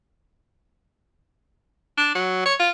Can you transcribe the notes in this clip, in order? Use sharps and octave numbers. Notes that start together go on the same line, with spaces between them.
D4
F#3
C#5
F4